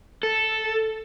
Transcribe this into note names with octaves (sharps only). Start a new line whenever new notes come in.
A4